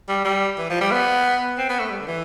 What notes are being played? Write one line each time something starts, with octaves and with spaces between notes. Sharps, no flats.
G3
G3
E3
F3
G3
B3
C4
B3
A3
G3
D3
E3